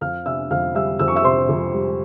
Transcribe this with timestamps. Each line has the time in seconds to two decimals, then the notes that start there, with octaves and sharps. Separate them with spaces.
0.01 F2 F5 F6
0.26 C3 E5 E6
0.51 F2 F5 F6
0.75 G3 E5 E6
0.99 F2 E6
1.08 C#6
1.16 E5 E6
1.24 C3 C5 C6
1.49 F2
1.74 G3